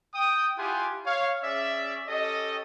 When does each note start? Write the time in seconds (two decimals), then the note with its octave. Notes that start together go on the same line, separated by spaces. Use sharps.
0.14 G5 D#6
0.57 E4 F4 G4 F#5 G#5 C6
1.06 C#5 F5
1.43 C#4 G#4 D5 E5
2.08 C#4 G4 A4 D#5